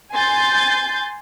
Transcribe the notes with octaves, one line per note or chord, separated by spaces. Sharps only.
G#5 C6 G6 A6